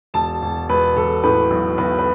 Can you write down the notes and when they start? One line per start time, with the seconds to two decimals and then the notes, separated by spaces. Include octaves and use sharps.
0.14 E1 A5
0.42 E1
0.69 E1 B4
0.96 E1 A4
1.23 A2 B4
1.51 B1
1.78 B1 B4
1.99 B4